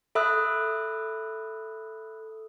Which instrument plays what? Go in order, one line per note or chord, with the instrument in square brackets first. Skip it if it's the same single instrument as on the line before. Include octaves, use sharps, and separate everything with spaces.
[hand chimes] A4 E5 B5 D#6 E6 F#6